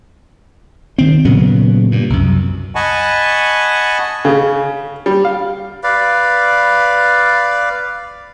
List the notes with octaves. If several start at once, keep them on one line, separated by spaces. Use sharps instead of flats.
D#3 C4
A#2 C#3 F#3 B3
G2 A#2
C2 F#2
D#5 F#5 G#5 A5 B5 C#6
C#3
G3
F5
B4 D5 F5